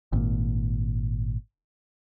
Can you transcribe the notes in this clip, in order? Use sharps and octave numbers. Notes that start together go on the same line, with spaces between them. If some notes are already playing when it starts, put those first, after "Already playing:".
G#1 A#2